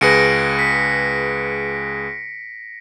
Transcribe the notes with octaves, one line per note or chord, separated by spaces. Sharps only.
C#2 G#4 B4 A#6 C#7 D7
B6